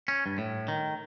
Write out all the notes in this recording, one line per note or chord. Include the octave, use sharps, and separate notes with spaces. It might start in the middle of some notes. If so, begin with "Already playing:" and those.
C#4
G2
A2
D#3